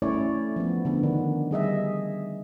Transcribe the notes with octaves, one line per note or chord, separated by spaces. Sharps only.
A3 C#4 E4 C#5 D5
F3 B3
D3 B3
D#3 D4
G3 G#4 D#5 E5